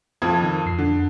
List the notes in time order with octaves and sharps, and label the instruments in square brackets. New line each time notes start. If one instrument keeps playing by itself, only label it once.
[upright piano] F2 F3 G#6
[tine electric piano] D#3
F2 C7
[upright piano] D3